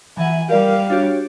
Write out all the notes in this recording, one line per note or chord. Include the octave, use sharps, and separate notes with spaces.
E3 E5 F#5 G#5
G3 G4 A#4 D5 F5
D4 F#4 G4 C#5